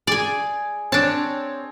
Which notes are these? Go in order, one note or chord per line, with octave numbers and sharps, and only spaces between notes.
G#4 D5 G#5
C4 D4 C#5 A5